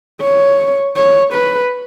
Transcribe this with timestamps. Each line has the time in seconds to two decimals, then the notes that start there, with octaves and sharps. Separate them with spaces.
0.21 C#5
0.96 C#5
1.34 B4